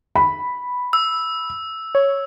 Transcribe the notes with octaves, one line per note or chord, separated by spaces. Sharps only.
B5
E6
C#5